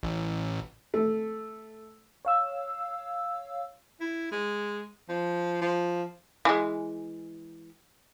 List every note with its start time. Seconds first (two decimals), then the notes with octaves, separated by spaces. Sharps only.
0.03 A1
0.94 A3
2.25 C#5 F5 E6
4.00 E4
4.31 G#3
5.09 F3
5.61 F3
6.45 E3 G#3